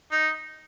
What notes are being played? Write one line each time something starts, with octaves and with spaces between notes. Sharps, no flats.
D#4